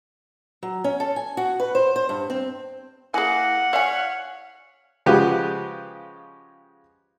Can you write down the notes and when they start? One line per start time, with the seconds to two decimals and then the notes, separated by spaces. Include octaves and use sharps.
0.63 F#3
0.84 C#4
1.00 A4
1.16 G#5
1.37 F#4
1.60 B4
1.75 C5
1.96 C5
2.09 G2
2.30 C4
3.14 A#3 E4 G#4 F#5 G#5
3.73 C#5 D5 E5 F5 G#5
5.06 C#3 F3 G#3 F#4 G4 B4